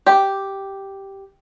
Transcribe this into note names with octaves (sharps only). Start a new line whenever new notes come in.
G4